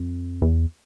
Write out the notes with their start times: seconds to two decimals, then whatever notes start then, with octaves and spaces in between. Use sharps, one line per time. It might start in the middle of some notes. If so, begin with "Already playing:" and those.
Already playing: F2
0.42 E2